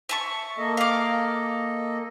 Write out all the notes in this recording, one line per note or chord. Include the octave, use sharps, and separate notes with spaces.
E5 A5 C#6
A#3 A4 D#5
F5 D6